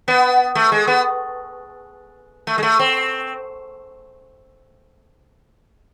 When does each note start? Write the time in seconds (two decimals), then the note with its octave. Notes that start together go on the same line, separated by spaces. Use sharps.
0.08 B3
0.55 A3
0.72 G#3
0.87 B3
2.47 A3
2.58 G#3
2.63 A3
2.79 C4